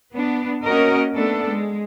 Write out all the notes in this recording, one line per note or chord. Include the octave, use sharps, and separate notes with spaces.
B3 D4
A#3 C#4 F#4 A#4 D#5
A3 B3 D4 A4
G#3